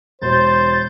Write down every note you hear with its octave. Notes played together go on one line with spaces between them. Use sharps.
E1 C5 G6 A6